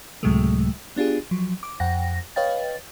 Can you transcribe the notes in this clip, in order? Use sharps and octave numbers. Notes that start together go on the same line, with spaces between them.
C#2 A2 C3 F#3 G#3 A3
B3 D4 F4 G4 G#4
F3 F#3
D6
F2 F#5 G5 A#6
B4 C#5 D#5 F5 G5 A6